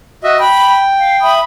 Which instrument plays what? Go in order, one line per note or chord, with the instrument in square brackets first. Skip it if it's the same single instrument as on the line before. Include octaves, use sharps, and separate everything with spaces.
[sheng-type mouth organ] F#4 D#5 E5
[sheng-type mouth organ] G5 [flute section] B5
[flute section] F5
E5 B5 D#6